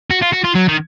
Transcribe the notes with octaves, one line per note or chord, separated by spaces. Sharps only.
F#4
F4
F#4
F4
F#3
D#3